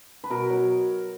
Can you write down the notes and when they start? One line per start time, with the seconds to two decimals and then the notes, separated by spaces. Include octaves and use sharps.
0.24 B4
0.30 B2 A#4
0.50 F#3